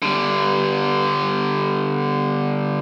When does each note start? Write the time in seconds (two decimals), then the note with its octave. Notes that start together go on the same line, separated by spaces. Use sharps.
0.02 D3 G3